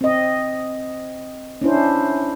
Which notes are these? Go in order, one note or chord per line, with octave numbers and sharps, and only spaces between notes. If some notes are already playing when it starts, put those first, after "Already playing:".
C4 D#5
C#4 D4 E4 C5